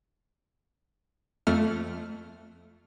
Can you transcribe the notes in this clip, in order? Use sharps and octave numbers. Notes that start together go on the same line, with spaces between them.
F2 A3 F6